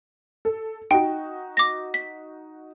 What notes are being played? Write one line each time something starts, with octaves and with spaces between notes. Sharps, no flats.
A4
D#4 F#4 G5
D6 A#6
B6